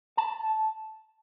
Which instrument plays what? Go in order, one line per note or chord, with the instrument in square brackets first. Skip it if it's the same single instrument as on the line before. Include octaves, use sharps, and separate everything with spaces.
[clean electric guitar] A5